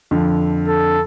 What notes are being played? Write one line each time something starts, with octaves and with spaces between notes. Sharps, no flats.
F2 D3
A4